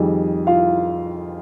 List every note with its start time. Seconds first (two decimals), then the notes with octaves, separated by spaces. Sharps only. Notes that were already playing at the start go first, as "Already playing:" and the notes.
Already playing: F2 D#3 G3 G#4
0.47 F4 F5